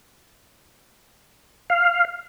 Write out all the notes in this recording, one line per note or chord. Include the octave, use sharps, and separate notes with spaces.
F5